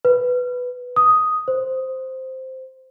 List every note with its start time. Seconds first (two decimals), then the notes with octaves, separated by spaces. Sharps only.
0.05 B4
0.96 D#6
1.48 C5